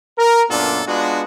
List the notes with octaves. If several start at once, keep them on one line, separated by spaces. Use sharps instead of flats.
A#4
F#2 A#2 B3 D4 F4 A4
G#3 B3 D4 F4 F#4